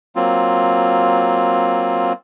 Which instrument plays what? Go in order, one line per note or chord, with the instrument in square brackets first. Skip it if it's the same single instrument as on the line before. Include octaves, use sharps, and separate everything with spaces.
[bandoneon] F#3 A#3 C4 F4